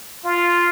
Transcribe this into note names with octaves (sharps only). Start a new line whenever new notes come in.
F4